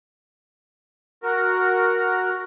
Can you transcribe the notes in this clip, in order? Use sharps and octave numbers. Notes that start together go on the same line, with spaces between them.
F#4 A#4